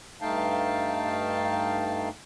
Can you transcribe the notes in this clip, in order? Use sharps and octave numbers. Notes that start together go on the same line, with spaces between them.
G2 A3 D#4 F5 G5 A5